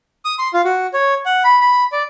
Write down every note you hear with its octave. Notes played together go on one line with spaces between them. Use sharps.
D#6
C6
F4
F#4
C#5
F#5
B5
B5
D5